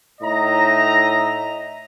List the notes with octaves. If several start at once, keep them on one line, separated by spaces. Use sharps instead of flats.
A2 D#4 D#5 E5 A#5